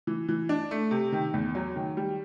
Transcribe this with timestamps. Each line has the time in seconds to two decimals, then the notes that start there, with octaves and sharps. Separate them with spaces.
0.07 E3
0.29 E3
0.49 D4
0.71 A3
0.91 C3
1.12 D#3
1.34 E2
1.55 F#3
1.76 D#3
1.97 G3